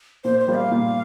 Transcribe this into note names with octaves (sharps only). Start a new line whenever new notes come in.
A#2 C5
C5
G3 A#3 F4
F5
A#2